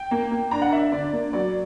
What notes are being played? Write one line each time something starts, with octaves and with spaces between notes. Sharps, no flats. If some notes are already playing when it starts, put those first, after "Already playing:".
Already playing: G5
A#3
A#3
D4 A#5
F#5
D4 E5
E5
D3 D5
A#3
F#3 D5